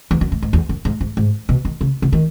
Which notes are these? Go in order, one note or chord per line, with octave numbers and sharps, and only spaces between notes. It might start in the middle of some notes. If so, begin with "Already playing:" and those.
E2
F#2
G#2
G#2
E2
F#2
G#2
G#2
G#2
B2
D#3
C#3
C#3
D#3